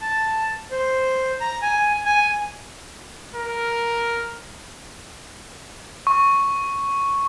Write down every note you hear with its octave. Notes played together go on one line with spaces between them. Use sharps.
A5
C5
A#5
G#5
G#5
A#4
C#6